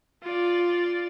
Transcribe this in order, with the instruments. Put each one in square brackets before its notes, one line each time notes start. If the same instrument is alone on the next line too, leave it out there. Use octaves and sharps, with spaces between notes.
[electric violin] F4 D5